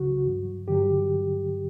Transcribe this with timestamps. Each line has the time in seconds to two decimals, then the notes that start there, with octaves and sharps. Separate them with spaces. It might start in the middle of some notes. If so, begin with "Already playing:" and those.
Already playing: C#2 C#3 F#3 F#4
0.25 G2 F#3
0.67 G2 D3 F#3 G4